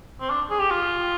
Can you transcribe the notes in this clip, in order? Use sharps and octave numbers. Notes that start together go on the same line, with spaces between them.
C4
D4
G#4
G4
F4